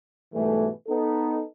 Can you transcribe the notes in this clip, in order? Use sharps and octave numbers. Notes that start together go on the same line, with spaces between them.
G#2 B2 E3 G3 A3
B3 D#4 A4